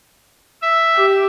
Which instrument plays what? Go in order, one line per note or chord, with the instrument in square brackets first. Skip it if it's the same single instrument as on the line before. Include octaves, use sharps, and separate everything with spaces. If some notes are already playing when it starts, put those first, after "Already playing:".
[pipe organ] E5
[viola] G4